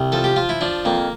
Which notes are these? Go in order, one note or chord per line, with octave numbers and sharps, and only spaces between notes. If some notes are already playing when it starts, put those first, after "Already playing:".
Already playing: C2
F3 A4
G4
F3 F4
E4
F3 D4
F2 A#3